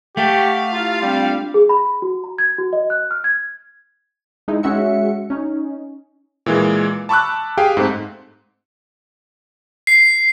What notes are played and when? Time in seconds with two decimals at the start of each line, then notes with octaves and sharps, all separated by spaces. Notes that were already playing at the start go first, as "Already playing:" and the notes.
0.17 A3 G4 F5 F#5 C#6
0.72 E4 F4 G4 A#5
1.02 G3 C4 D4 F4
1.54 G#4
1.69 B5
2.02 F#4
2.24 A#5
2.38 G#6
2.58 F#4
2.73 D#5
2.90 F#6
3.11 F6
3.24 G#6
4.48 G#3 D#4 E4
4.63 G#3 C#4 F#4 E5 C#7
5.30 C#4 D#4
6.46 A#2 E3 G#3
7.09 A5 B5 C#6 D6 E6 F#6
7.57 G4 G#4 F5 G5
7.77 G#2 A3 C4
9.87 C7